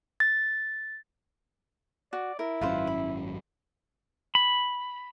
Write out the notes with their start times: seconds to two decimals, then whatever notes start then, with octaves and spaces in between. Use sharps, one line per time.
0.20 A6
2.13 F#4 D5
2.39 E4 A#4
2.61 G#1 F#2 C#4 F4 B4 C5
2.87 B5
4.35 B5